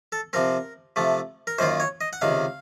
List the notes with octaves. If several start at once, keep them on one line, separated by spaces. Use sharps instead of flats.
A4
C3 F3 C4 A#4
C3 F3 A3
A#4
F#2 D#3 A#3 F4 C5
C#5
D#5
F#5
C#2 C3 D#3 F5